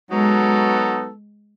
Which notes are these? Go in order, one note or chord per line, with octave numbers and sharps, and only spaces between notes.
F#3 G#3 B3 D#4 F#4 A4